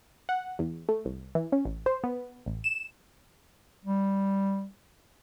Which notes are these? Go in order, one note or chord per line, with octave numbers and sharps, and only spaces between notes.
F#5
E2
A3
C2
E3
C#4
A1
C5
B3
A1
E7
G3